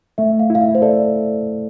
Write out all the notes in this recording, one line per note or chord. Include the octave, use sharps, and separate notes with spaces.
A3 E5
F5
E4
F5
E5
C5
A4 D5